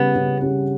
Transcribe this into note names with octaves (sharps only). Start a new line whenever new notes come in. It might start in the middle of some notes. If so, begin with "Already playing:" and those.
Already playing: C#3 G3 B3 C#4
C#3
G3 C#4